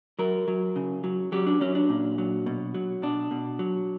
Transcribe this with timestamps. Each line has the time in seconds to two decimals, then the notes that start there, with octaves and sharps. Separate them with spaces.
0.19 F#3 A#4
0.48 F#3
0.76 C#3
1.04 F#3
1.32 F#3 G4
1.47 D4
1.61 F#3 C#4
1.75 D4
1.89 A#2
2.18 F#3
2.46 B2
2.74 F#3
3.02 B2 D4
3.31 B2
3.59 F#3